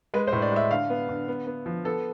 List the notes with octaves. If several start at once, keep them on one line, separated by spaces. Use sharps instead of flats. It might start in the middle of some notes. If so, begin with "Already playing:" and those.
G#3 B4
C5
A2
D5
G#3 E5
D3 F5
B3
D3
B3
B3
F3
B3 A4